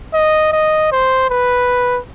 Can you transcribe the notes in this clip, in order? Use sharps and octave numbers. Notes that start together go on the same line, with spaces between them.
D#5
D#5
C5
B4